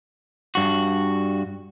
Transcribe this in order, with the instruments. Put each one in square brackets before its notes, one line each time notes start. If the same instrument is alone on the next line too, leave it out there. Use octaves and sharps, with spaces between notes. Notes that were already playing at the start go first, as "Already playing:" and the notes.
[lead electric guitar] G2 F#4